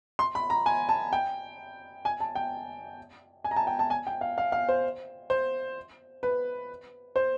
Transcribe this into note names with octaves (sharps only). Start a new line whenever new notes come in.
C6
B5
A#5
G#5
A5
G5
G#5
A5
G5
G#5
A#5
A5
G5
A5
G#5
G5
F5
F5
F5
C5
C5
B4
C5